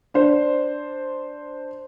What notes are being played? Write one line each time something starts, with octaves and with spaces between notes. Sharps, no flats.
D4 C5